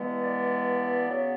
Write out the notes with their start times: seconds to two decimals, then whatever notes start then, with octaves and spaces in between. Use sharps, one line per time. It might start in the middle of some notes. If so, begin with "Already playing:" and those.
Already playing: G2 E3 G#3 B3
0.17 D5
1.08 C#3 F#3 B3